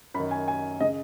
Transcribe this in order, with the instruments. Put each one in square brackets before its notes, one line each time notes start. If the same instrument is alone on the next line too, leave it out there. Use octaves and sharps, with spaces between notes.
[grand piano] F#2 B5
D#3
G#5
G#5
C#3 D#5